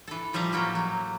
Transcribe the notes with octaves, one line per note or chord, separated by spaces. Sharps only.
E3 A4
A2 F3 G3 E5 F5 A#5
A2 F#3 A#3 A4 G5
F#3